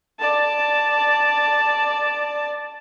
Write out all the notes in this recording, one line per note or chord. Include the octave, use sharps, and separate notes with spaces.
D5 A5